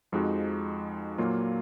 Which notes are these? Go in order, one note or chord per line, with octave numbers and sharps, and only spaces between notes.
F2 F3 G#3 D#4 F#4
A#2 F#3 A#3 F4